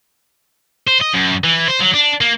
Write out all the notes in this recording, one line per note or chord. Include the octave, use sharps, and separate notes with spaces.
C5
D#5
F#2
E3
C5
F#3
D4
A#3